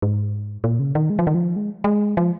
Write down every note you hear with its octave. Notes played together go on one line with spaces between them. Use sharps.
G#2
A#2
C#3
D#3
G#3
F3
D#3
F3
G#3
G#3
F3